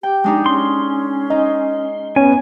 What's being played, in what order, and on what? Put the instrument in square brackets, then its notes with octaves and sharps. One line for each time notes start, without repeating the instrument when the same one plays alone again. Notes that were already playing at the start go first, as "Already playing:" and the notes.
[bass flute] G4 [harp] G5
[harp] G#3 D4 D#4
[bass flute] C#4 [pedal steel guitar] C6
[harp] D#4 [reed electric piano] D#5
[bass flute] B3 [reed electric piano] C#4 C#5 [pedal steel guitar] G#5